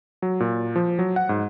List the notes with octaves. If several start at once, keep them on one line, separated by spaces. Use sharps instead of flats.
F#3
A#2
F3
F#3
F#5
G#2